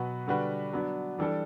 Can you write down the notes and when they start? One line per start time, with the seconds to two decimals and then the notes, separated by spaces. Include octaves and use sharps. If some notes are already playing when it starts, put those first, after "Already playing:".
Already playing: B2 F#3 B3 F#4 B4
0.27 D3 G3 D4 F#4 B4
0.73 F#3 B3 D4
1.18 E3 G3 D4 A4